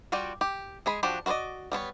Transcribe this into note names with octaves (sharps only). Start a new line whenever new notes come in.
G3 F4 F#4 D5 G5
G4
G#3 G#4 B5
F3 D4 F#4 G4
F#4 A#4 C5 D5 D#5
G3 B3 C5 C#5